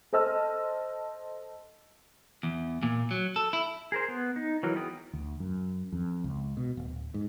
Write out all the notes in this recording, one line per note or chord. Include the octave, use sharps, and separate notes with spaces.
A4 C5 D#5 A5 E6 F6
E2
A#2
F#3
A4
E4
G#4 A#4 C5
B3
D#4
E3 F#3 A#4
B3 G#4 G5 D#6
D2
F#2
F2
C#2
B2
D1
G#2